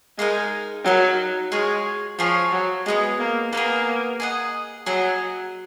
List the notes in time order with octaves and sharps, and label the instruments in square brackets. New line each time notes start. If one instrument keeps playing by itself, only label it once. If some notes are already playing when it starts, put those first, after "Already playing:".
[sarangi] G#3 [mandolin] D#4 A#4 F5
[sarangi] F#3 [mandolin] D#4 A#4 F5
[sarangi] G#3 [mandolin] F4 G#4 C#5
[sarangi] F3 [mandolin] F4 G#4 C#5
[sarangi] F#3
[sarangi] G#3 [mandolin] B3 D#4 G#4
[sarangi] A#3
[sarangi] A#3 [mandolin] B3 D#4
[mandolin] G#4
G#4 D#5 F#5
[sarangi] F#3 [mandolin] G#4 D#5 F#5